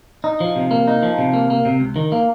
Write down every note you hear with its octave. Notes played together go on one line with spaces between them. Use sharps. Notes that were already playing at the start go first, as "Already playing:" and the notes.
D#4
F3
C3
A#3
D#4
F3
C3
A#3
A#3
C3
C#2
D#3
A#3